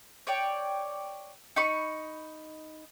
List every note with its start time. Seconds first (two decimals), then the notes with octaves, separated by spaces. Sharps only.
0.27 C#5 D5 G5
1.56 D#4 B5 C#6